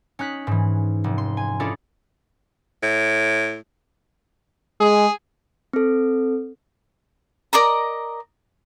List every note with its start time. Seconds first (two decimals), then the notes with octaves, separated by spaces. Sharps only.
0.19 C#4 D#4 F#6 B6
0.47 G#2 E3
1.04 F1
1.18 C6
1.37 G#5
1.60 C#4 D4 E4 F4 A4 D#5
2.82 A2
4.80 G#3 G#4
5.73 C4 A4
7.53 A#4 D5 D#5 A#5